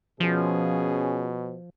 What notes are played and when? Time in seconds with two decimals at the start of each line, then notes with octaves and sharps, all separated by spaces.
0.20 B2 F3 C#4 G#4